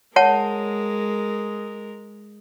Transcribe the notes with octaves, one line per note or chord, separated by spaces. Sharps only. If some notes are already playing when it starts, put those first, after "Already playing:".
G#3 A#4 C#5 F#5 A5